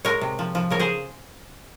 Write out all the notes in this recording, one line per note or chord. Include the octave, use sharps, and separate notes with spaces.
G#3 A#4 C#5
C3
F3
F3
C#3 A#4 C#5
G#4 C5